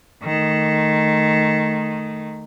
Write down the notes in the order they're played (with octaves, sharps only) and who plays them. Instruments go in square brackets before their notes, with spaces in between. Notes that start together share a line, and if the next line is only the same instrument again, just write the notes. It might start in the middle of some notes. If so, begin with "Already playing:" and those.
[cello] D#3 A3